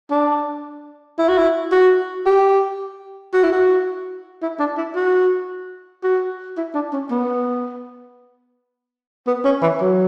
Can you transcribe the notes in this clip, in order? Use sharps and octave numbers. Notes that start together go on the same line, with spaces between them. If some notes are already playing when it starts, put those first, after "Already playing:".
D4
E4
F#4
E4
F#4
G4
F#4
E4
F#4
E4
D4
E4
F#4
F#4
E4
D4
C#4
B3
B3
C#4
E3
F#3